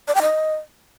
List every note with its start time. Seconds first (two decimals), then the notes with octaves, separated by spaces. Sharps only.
0.08 D5
0.15 G5
0.22 D#5